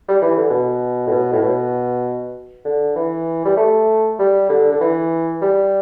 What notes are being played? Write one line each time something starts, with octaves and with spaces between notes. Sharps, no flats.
G3
E3
D3
B2
A2
B2
A2
B2
D3
E3
G3
A3
G3
D3
D3
E3
G3